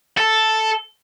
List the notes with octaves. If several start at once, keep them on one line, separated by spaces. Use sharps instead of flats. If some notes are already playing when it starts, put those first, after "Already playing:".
A4